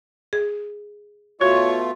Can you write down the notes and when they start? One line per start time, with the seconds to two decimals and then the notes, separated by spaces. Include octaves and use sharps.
0.33 G#4
1.41 B2 A3 F4 F#4 C#5